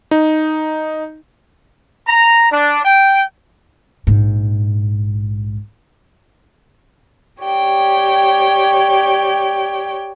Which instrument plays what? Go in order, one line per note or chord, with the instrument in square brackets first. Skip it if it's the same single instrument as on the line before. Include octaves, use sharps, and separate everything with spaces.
[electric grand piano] D#4
[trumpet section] A#5
D4
G5
[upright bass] A#1 G#2
[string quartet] G4 C#5 D5 G5